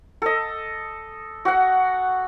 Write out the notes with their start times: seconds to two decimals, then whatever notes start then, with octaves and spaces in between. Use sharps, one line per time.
0.22 A4 D#5
1.45 F#4 F#5